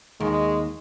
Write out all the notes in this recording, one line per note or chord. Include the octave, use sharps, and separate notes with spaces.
D#2 G#3